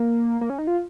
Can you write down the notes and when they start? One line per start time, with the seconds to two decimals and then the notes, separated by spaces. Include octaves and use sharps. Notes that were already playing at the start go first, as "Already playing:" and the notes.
Already playing: A#3
0.41 A#3
0.50 C#4
0.58 D#4
0.67 F4